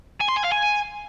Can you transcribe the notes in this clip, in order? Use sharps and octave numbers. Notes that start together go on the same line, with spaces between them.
G#5
C6
G#5
F5
G#5